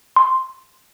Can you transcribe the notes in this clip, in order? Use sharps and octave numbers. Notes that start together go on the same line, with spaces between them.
C6